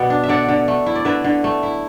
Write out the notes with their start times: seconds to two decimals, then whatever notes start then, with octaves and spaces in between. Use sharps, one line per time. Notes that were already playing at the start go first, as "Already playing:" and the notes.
Already playing: B2 B3 D5 F#5
0.10 D4
0.23 E5
0.29 D3 D5 F#5
0.49 D3
0.68 A3
0.86 E4
0.95 D5
1.05 D3 B4 E5
1.24 D3
1.44 A3
1.63 E4